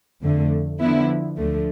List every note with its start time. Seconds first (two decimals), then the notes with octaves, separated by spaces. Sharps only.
0.22 F2 D3 A3
0.80 D3 F3 B3 E4
1.37 D2 D3 F3 A3